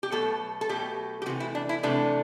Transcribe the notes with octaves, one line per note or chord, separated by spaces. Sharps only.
G4
B2 F#3 A3 A4
A4
B2 F#3 A3 G4
G4
C3 E3 A3 F#4
E4
D4
E4
C3 E3 A3 D4